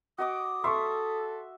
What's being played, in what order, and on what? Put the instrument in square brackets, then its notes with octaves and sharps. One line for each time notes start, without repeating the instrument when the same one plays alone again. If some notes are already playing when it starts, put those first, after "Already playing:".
[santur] F#4 D#5 D6 [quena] D#6
[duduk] A4 [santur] E5 [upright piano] C6 C#6